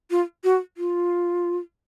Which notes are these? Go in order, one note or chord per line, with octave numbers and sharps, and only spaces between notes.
F4
F#4
F4